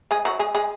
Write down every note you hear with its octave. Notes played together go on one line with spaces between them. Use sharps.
G#3 G#4
F#3 F#4
G#3 G#4
G#3 G#4